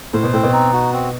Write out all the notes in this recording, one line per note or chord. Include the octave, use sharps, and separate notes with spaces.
A2 C5
B2
A2 C4
B2
D#4
F#4
C4